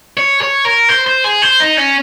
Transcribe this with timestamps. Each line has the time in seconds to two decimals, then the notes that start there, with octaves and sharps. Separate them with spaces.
0.17 C#5
0.41 C#5
0.65 A#4
0.89 C5
1.07 C5
1.24 G#4
1.42 C5
1.60 D#4
1.77 C#4